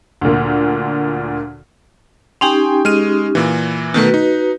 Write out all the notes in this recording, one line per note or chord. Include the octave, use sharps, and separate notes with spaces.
D2 A#2
C#4 D#4 G4 G5 G#5 C6
G#3 F6 D#7
A#2 E3
B2 D#3 A3 F#4 B4
D#4